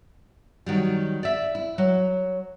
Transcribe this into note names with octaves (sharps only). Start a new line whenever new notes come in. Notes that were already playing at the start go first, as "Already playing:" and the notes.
D#3 F#3 G3
D5 E5
E4
F#3